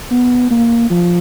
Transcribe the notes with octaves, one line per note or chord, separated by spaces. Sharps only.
B3
A#3
F3